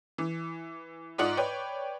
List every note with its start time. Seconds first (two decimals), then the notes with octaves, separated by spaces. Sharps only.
0.18 E3
1.18 G#2 F4 D5 F#5 D#6 F#7
1.37 B4 C#5 D5 G5